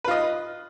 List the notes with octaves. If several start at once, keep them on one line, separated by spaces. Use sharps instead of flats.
F4 B4 D#5